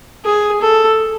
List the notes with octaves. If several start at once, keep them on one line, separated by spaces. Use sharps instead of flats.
G#4
A4